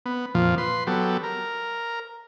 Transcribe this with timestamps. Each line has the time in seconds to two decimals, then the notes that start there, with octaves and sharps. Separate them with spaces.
0.06 B3
0.34 F2 A#2 F3
0.58 B4 C6
0.87 F#3 B3 G4 A4
1.23 A#4